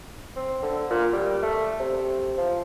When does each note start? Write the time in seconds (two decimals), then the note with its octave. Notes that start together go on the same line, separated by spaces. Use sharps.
0.36 C4
0.63 D3
0.90 A#2
1.13 G3
1.43 A3
1.80 C3
2.38 F3